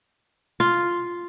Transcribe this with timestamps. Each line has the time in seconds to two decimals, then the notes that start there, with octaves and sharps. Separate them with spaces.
0.60 F4